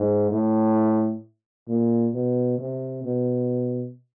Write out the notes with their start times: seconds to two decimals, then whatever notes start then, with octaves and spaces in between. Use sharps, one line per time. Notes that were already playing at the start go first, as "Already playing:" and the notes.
Already playing: G#2
0.31 A2
1.68 A#2
2.14 B2
2.59 C3
3.04 B2